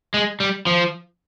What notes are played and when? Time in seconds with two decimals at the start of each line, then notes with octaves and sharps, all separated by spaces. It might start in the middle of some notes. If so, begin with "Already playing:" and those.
0.14 G#3
0.40 G3
0.66 F3